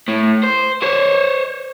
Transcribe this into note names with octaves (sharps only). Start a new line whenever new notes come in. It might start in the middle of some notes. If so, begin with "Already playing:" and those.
A2
C5
C5 C#5